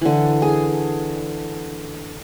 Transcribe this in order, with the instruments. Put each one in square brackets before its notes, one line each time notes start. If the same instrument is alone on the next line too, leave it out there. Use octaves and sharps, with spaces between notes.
[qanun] D3 E3
G#4